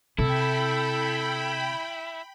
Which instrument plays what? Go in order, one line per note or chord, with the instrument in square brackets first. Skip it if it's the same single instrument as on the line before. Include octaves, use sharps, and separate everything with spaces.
[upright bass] C3 [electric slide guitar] E4 [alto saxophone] A4 [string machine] G5 B5